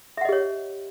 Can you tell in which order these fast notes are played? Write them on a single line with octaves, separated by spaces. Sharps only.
E5 F#5 D#5 G4 C#5